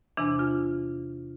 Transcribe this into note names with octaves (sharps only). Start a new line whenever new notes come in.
E2 C3 E3 D4
F4